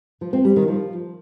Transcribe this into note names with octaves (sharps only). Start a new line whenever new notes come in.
F3
C4
G3
D#3
F3